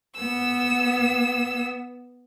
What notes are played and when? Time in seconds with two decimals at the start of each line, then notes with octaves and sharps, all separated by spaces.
0.17 B3 E6